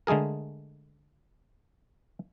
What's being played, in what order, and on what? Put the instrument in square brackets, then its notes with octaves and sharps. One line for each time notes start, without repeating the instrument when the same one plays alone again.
[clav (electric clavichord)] D3 G#3 A3 G#4 A#4